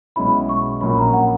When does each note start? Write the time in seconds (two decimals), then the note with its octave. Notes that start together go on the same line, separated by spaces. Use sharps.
0.16 B1 B2 G#3 C#4 E4 B5
0.49 C#6
0.81 A#1 A#2 F#3 C#4 B5
0.98 A#5
1.13 F#5